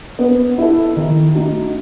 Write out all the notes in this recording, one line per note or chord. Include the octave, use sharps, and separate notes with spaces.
B3
E4 A4
D#3
A3 D#4 F#4